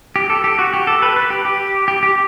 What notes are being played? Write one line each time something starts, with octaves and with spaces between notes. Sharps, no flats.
G4
A4
G4
F#4
G4
A4
B4
B4
G4
G4
G4
G4